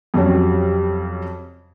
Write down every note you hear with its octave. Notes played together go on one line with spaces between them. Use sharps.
F2 C3 F#3 G3 C#4